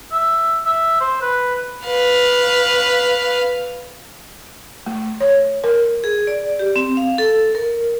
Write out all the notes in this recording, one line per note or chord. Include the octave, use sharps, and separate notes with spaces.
E5
E5
C5
B4
B4 F5
A3
C#5
A#4
G#4
D5
G4
C4
F5
A4
A#4